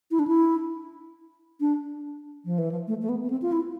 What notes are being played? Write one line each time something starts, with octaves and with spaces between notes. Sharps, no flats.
E4
D4
E4
D4
F3
E3
F3
A3
A3
B3
B3
C4
F4
E4